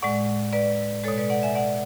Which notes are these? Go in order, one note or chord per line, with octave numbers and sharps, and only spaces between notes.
A2 G#3 D5 F#5
B4 D5
B2 G#3 A4 C#5
B4 D5
D5 F#5
E5 G#5
D5 F#5